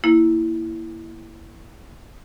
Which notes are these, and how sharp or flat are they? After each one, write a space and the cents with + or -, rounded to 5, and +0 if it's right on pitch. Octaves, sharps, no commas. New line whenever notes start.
A#3 +0 E4 +0